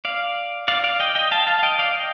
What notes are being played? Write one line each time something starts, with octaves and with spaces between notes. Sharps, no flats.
D5 F5
D5 F5
D5 F5
D#5 G5
D#5 G5
F5 A5
F5 A5
F5
D#5 G5
D5 F5
D#5 G5